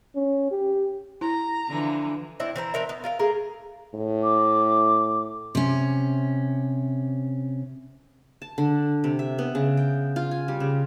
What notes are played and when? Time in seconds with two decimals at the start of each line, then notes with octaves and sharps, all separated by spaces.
0.16 C#4
0.51 G4
1.21 E4 A#5
1.69 D3 E3 F3
2.40 C4 D4 E4
2.56 E3 C5 A#5
2.74 C4 D4 A#4 E5
2.89 B3
3.04 F4 A#4 F5
3.19 A3 G#4 A#4
3.94 A2
4.23 D6
5.55 C3 C#4
8.42 A5
8.58 D3
9.04 C3
9.19 E5
9.38 B3
9.55 C#3
9.77 G5
10.16 F4
10.31 G#5
10.48 G3
10.60 C#3